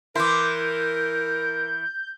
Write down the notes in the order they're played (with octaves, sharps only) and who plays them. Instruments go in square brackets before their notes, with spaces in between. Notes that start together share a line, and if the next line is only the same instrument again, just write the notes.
[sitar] E3 E4 [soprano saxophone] A#4 [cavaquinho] C6 D6 [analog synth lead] G6